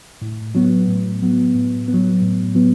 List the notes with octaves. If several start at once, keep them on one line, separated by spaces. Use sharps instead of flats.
A2
F#3 B3
A2
F#3 B3
A2
B3
F#3
A2
F#3 B3